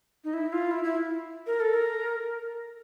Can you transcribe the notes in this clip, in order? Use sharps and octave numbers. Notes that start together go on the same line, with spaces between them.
D#4
E4
F4
E4
E4
A#4
A4
A#4